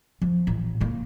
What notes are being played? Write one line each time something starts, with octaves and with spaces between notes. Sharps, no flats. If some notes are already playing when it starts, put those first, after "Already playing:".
F3
A1
C#3 A#3